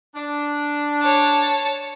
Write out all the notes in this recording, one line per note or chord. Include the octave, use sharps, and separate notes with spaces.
D4
C#5 A5